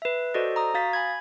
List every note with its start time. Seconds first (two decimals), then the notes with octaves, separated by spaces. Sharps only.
0.02 B4 E5
0.34 F#4 A4 C5 D5 D#5
0.56 A#5 D#6
0.74 F#4 F5 D#6 A6 B6
0.93 G#5 B5 G#6